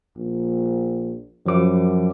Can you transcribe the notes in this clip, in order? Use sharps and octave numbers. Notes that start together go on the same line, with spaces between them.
A#1
F#2 F3 D6